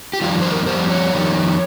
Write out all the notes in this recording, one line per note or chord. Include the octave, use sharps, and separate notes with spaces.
G4
F2 D#3 G3 F4
C5
A#4
F2 D#3 G3 C5
C#5
F2 D#3 G3